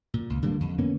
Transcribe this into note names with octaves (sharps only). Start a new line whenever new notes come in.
A#2
C#2
D3 G3 A#3
F2
D3 A#3 B3 C#4